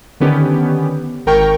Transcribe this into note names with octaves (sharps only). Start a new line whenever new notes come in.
D3 D#3 B3 C#4 G4
G#1 A#4 G5 C#6